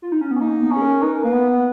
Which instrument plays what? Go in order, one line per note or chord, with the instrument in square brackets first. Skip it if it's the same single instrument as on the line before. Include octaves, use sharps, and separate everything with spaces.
[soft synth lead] F4
D#4
C#4
B3
[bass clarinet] C#4
[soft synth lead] A#3 [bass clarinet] D#4
[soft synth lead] B3
[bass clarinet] C#4
[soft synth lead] G#4
A#4
[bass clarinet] D#4 [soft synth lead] B4
[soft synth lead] A#4
[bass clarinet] A#3 [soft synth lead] B4
[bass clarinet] B3